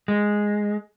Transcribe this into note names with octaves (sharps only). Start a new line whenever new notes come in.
G#3